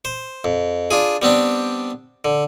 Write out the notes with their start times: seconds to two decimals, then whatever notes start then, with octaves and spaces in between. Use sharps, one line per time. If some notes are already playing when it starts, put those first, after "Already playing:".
0.05 C5
0.44 F2
0.91 D4 F4 G#4
1.22 G3 B3 C4 D4
2.25 D3